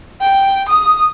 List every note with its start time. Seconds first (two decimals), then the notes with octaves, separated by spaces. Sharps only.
0.21 G5
0.69 D#6